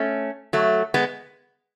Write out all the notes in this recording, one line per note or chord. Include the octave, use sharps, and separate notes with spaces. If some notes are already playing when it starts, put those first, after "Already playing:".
Already playing: A3 C#4
F#3 A3
G#3 B3